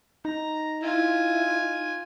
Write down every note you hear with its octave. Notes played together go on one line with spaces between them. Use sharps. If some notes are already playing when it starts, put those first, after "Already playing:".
D#4 A#5
E4 F4 G#5